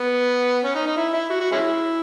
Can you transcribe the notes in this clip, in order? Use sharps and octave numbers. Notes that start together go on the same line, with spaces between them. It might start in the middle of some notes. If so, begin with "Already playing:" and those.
Already playing: B3
C#4
D#4
D#4
E4
E4
F#4
F#4
G#3 C#4 E4